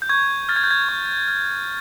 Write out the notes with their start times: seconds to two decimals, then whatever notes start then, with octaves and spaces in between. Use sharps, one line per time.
0.02 G6
0.09 C#6 G#6
0.49 F6 A6
0.56 G#6
0.63 G6
0.71 G#6
0.89 C#6
1.28 F6